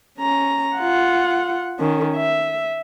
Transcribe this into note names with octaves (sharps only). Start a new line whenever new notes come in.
C#4 A#5
F4 F#5
D#3 C#4
E5